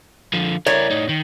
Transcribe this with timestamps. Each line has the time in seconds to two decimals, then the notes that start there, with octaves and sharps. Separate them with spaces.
0.34 D3 F3
0.66 E4 A#4 C#5 D5
0.91 A2 D#4
1.09 D#3